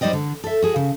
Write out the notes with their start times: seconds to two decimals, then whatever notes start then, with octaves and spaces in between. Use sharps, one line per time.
0.01 G3 D#4 C5 D5 D#5 G5
0.13 D3
0.44 A4 E5
0.62 F#4 G#4
0.76 C#3